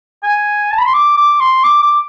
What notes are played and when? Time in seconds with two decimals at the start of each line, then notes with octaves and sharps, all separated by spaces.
0.23 G#5
0.72 A5
0.78 B5
0.86 C6
0.94 D6
1.17 D6
1.40 C6
1.64 D6
1.82 D6